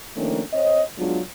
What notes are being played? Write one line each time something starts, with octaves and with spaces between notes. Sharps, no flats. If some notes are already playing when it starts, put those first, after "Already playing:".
D#3 F3 A3 A#3 C#4 D4
C4 C#5 D#5
F#3 G#3 B3 D4 F4